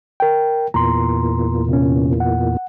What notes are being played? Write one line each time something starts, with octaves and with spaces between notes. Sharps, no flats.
A#4 G5
E2 A#2 A#5 C6
C3 C#4
F#5